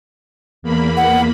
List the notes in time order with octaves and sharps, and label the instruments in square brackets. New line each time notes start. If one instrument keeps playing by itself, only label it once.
[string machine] E2 A#3 B5
[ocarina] F#5